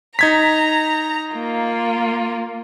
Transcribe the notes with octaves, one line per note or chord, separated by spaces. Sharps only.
D#4 A#5 G#6 B6
A#3 F4